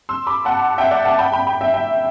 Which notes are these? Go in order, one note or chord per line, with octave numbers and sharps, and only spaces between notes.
C6 E6
B5 D6
F#5 A5
E5 G5
D5 F#5
F#5 A5
G5 B5
G5 B5
G5 B5
E5 G5
E5 G5